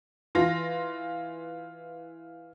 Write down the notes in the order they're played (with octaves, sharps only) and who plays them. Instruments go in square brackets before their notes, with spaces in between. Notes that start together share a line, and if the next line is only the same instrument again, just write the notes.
[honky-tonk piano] E3 F4 A#6